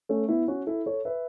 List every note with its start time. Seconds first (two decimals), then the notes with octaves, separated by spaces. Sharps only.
0.09 A3 C#4
0.29 B3 E4
0.48 C#4 F#4
0.67 E4 A4
0.86 A4 C#5
1.05 B4 E5